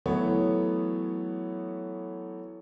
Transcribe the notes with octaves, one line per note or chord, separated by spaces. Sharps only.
E3 F#3 A3 B3 C#5